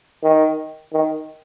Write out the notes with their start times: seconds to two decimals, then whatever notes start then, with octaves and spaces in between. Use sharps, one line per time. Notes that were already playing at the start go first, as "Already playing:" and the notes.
0.23 D#3
0.93 D#3